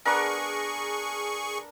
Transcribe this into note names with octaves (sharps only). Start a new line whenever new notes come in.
B3 D4 G#4 A#4 C#6